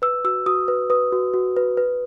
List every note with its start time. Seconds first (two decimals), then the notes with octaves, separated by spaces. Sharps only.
0.02 B4 E6
0.24 F#4 E6
0.46 F#4 D#6
0.68 B4
0.90 B4 D#6
1.12 F#4
1.34 F#4
1.57 B4
1.77 B4